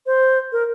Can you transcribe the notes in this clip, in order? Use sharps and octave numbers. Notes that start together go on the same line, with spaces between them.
C5
A#4